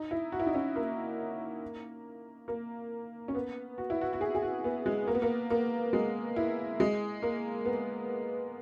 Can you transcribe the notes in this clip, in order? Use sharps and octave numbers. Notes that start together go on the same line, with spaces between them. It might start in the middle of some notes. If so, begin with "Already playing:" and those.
Already playing: D#4
E4
F#4
E4
D#4
C#4
A#3
A#3
C#4
B3
F#4
E4
F#4
F#4
G#4
G#4
F#4
B3
G#3
A#3
B3
A#3
A#3
G#3
E4
G#3
A#3
B3